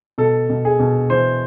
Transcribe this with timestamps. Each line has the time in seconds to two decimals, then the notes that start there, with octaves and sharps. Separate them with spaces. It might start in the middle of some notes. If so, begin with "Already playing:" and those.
0.18 B2 A4
0.50 B2
0.65 G#4
0.79 B2
1.10 E3 C5